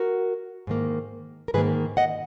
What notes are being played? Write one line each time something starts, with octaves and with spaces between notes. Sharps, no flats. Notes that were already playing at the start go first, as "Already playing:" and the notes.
Already playing: F#4 A#4
G#2 D#3 A#3
A#4
G#2 D#3 A#3 G#4 B4
D#5 F#5